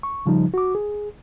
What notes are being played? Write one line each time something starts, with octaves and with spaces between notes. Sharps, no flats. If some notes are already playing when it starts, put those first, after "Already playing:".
C#6
C#3 F3 G3 D#4
F#4 D6
G#4